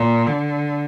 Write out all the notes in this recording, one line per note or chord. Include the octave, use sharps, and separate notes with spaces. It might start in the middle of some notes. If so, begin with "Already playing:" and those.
Already playing: A#2
D3